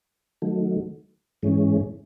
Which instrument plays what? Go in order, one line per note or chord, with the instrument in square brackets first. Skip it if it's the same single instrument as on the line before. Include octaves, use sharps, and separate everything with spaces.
[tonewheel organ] D#3 F#3 A3
G#2 E3 G#3 C#4